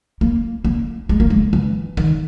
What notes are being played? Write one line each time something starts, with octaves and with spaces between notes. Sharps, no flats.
A#3
A#3
G#3
A#3
G#3
E3
D#3